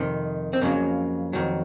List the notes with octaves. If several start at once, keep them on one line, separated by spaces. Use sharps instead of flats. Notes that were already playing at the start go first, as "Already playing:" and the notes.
Already playing: F2 C3 D#3
C4
F2 C#3 F#3 A#3
F2 D#3 F#3